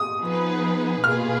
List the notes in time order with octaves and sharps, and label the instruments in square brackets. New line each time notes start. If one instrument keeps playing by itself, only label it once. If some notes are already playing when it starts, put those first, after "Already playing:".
Already playing: [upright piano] D#6
[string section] F3 B3 D#4 G#4 B4
[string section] B2 A#3 F4 G#4 B4 [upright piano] F6